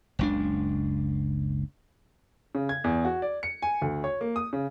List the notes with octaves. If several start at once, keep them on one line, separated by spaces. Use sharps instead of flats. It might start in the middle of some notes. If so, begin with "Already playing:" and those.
F#1 C#2 D4
C#3
G#6
E2
F#4
D5
C#7
G#5
D2
C#5
A#3
D#6
C#3